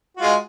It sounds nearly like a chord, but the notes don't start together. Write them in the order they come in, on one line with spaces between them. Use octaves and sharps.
F#4 F4 G#3